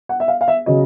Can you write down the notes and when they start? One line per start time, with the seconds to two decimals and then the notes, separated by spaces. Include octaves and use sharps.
0.09 F#5
0.20 E5
0.28 F5
0.41 F5
0.48 E5
0.66 C#3 F#3 D#5